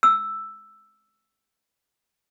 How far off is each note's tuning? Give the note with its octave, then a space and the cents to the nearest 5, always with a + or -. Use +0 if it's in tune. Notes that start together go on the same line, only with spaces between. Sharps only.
E6 +5